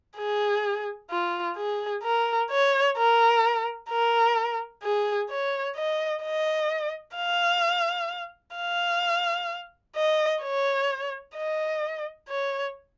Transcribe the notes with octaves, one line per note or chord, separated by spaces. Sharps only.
G#4
F4
G#4
A#4
C#5
A#4
A#4
G#4
C#5
D#5
D#5
F5
F5
D#5
C#5
D#5
C#5